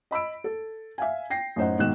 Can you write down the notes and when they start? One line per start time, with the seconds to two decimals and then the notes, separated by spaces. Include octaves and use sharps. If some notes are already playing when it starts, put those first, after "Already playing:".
0.11 D#5 B5 E6 D7
0.44 A4
0.98 E5 F5 G#5
1.30 G5 A#6 C7
1.56 F#2 A2 D#4 C5 D#5 F#5
1.79 G#2 B2 D#3 F#6 E7